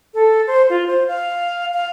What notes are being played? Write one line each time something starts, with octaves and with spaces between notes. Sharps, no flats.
A4
C5
F4
C5
F5
F5